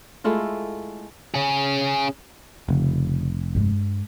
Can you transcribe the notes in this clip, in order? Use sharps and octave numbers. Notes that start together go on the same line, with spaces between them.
G#3 A3 E4 F4
C#4 G#4
F1 C#3
G2 G#3